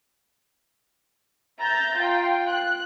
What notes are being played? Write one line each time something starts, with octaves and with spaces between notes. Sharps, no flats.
E5 A#5 G6 A6
F4 G5
F#6